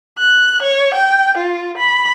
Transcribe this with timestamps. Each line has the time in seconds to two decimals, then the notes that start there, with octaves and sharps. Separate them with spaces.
0.18 F#6
0.62 C#5
0.94 G5
1.37 F4
1.78 B5